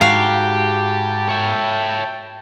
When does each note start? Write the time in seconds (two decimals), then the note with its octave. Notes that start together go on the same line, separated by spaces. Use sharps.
0.01 G#2 F#4 G4 F5 G5 A5
1.29 C#5 E5